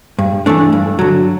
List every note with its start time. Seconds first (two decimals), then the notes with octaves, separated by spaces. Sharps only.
0.19 G2
0.46 E3 A3 D4
0.73 G2
0.99 D3 F#3